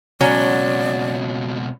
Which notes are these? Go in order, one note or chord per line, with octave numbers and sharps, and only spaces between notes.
C#2 B2 F#3 C#4 D5